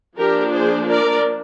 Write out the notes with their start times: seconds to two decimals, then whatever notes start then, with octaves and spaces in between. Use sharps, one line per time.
0.17 F3 A#3 D4 G4 A#4
0.53 G#4 C5
0.89 A#4 D5